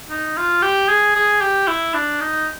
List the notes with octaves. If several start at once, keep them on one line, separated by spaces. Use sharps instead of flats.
D#4
F4
G4
G#4
G#4
G4
E4
D4
D#4